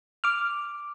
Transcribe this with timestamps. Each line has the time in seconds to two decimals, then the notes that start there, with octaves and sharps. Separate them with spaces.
0.24 D6 F6